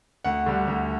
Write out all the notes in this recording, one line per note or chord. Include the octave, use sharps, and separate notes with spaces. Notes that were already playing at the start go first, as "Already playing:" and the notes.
D2 F#5
D3 G3
D2